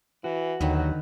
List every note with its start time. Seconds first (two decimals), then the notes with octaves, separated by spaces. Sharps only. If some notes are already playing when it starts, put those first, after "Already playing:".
0.24 E3 F#4
0.61 D#2 D3 D#3 F#3 B4